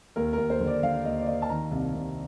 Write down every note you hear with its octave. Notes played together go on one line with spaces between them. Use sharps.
D#2 A#4
D#2 A#4
C5
D3
D5
D3 F5
D#2 D#5
D5
D#2 D#5
A5
D#3 A#5
C2
C2